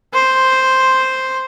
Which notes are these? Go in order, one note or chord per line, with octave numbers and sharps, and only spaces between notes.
C5